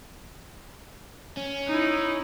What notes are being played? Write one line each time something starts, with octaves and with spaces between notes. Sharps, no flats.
C#4
D#4 E4